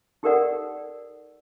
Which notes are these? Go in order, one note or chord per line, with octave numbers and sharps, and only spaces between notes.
D#4 G4 A4 A#4 D5 F#5